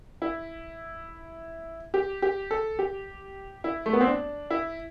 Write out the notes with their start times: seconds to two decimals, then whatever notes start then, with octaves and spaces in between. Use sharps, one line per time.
0.22 E4
1.94 G4
2.22 G4
2.51 A4
2.79 G4
3.64 E4
3.86 A3
3.93 B3
4.01 C4
4.07 D4
4.50 E4